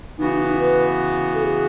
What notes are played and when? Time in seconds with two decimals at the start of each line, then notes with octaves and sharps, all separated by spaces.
0.18 C#3 E3 B3 D#4 F#4
0.33 D#4
0.47 D#4
0.60 B4
1.34 A4
1.43 G#4